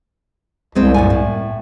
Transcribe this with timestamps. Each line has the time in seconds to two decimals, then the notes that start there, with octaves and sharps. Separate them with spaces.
0.75 C2 F#3 G#3 C4
0.94 F#2 A#2 G#5
1.10 A2